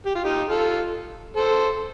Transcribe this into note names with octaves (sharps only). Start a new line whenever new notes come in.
G4
F4
D#4 G4
F4 A4
A4 C5